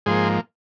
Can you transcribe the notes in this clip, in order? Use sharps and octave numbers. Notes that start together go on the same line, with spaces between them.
G#2 F3 A#3 G#4 C5